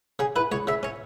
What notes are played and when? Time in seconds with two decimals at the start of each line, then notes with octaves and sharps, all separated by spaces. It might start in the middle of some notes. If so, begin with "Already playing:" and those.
0.19 C#3 G#4
0.36 E4 B4
0.52 C#2 C#5
0.67 C#3 E5
0.83 C#4 C#5